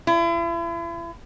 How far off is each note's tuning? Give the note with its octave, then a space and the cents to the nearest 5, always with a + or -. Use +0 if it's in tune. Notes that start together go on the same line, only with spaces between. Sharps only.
E4 +40